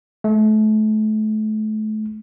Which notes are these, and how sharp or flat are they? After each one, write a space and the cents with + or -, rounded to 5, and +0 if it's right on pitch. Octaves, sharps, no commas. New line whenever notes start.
A3 -35